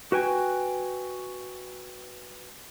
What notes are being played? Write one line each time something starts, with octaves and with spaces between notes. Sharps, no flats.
F#4 B4 G5 G#5